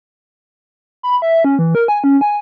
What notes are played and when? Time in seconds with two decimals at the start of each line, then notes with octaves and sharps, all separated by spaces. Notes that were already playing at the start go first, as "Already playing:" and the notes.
1.03 B5
1.22 E5
1.44 C#4
1.59 E3
1.75 A#4
1.88 G#5
2.04 C#4
2.21 G#5